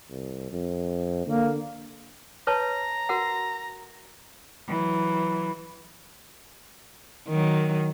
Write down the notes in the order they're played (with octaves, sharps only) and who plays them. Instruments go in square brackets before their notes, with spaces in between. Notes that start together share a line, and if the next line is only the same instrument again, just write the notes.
[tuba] C2
F2
[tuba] D3 [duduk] A#3
[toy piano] B4 C#5 A5 [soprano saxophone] A#5
[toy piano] F#4 A#4 F#5
[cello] E3 F#3
[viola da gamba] D#3 F#3